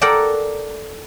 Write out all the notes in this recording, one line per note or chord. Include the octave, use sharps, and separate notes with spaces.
A4 A#4 D5 F#5 G5 A5